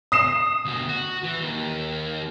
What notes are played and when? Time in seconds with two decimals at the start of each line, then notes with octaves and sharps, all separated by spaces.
0.12 D#6 C7 E7
0.65 D2 B2
0.89 F#4
1.24 E3
1.41 D#2